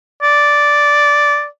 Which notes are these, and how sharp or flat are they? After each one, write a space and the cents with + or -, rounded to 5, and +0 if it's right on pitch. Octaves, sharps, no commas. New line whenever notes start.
D5 -5